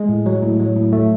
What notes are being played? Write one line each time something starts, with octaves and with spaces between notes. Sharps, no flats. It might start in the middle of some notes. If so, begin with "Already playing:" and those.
Already playing: G#3
A2
F#3
A2
F#3
A2
F#3 A3